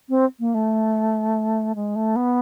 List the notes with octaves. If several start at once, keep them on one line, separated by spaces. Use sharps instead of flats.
C4
A#3
A3
G#3
A3
B3